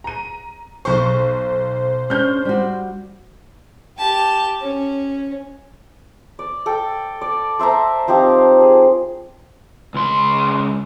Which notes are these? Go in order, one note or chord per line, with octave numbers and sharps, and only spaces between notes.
A#5 D#7
B1 C5 C#6
C#4 D4 F6 G6
G3 F#4
G4 A5
C#4
D5
A4 G5
D5
C5 E5 A5 A#5
F3 C4 D#4 G4
G#4
C#2 C6